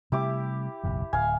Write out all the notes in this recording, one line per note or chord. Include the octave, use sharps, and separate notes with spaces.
C3 G3 A3 E4 G4 D6
F#1 B1 E2
D1 F5 G#5